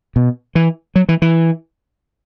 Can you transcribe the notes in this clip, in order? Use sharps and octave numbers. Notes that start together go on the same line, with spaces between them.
B2
E3
F#3
E3
E3